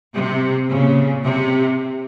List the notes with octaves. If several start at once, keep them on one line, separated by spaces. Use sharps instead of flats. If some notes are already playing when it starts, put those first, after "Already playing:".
C3
A#2 C#3
C3